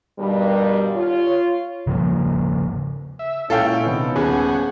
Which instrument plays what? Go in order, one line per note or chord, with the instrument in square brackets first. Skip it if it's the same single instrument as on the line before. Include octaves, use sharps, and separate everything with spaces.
[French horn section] G2 B2 D#3 G3
F4 C#5
[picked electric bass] C#3 F3 A#3
[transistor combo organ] E5
[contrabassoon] C#2 [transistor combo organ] A#2 E4 [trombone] C#4 [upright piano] A4 F5 G5
[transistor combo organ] C3 D#3 [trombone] B3
[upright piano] D#1 [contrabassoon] C#3 [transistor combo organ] F#5 G#5